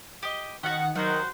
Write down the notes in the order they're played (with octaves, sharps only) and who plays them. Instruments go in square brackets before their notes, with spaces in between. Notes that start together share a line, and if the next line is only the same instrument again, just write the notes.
[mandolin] G4 D#5
[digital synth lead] D#3 [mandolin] C#4 F#4 [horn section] F#5
[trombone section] G#1 G3 C5 [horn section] D#3 [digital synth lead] F#3 [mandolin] F#4 F#5